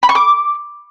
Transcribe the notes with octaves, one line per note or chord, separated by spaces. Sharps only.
B5
C#6
D6